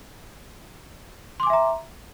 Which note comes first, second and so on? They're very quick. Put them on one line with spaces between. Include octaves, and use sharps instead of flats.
C6 D6 G#5 E5 A#5